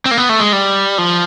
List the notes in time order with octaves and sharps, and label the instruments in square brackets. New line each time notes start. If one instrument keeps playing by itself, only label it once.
[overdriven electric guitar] C4
A#3
B3
A3
G#3
G3
F3